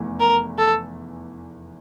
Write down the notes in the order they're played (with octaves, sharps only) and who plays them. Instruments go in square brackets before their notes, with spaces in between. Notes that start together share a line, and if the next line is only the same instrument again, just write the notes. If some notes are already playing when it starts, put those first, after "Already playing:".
Already playing: [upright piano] F1 E2 E3 A3
[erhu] A#4
A4